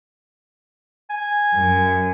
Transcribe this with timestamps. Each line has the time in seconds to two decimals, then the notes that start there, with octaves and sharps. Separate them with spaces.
1.10 G#5
1.54 F#2